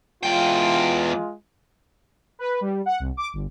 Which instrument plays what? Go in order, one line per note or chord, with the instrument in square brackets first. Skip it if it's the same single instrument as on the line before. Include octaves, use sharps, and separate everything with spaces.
[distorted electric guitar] E2 G5 [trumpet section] G#3 F4
[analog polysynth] B4
G3
F#5
C2
D6
G1